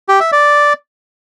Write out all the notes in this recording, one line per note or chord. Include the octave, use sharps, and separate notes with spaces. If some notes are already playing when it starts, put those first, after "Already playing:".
G4
E5
D5